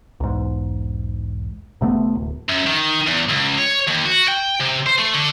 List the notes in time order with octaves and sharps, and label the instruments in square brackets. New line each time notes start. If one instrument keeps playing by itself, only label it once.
[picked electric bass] B1 E2 G#2
G1 C3 A3 B3
D1
[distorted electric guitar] F#2
D#3
E2
C#2
C#5
D#2
F#4
G5
C3
C5
A3
D3